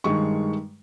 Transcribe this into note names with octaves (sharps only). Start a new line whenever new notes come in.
G2 D#3 G#3 C#6